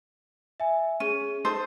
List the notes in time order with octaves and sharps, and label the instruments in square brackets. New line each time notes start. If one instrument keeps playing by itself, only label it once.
[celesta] E5 G#5
[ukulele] C#4 [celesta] G#4 D#7
[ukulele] D#4 A4 C5